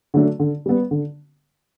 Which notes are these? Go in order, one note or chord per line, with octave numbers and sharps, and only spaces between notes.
D3 F#3 A3 D4
D3
G3 B3
D3